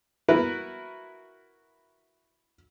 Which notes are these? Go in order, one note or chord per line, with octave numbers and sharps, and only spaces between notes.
E4 F#4 A#4 B4